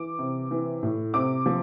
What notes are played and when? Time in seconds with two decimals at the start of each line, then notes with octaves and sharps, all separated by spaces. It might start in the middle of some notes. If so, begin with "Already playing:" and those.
Already playing: E3 D6
0.19 C3
0.51 E3
0.83 A2
1.14 C3 D6
1.46 F3